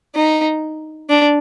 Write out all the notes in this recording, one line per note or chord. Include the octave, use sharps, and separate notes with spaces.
D#4
D4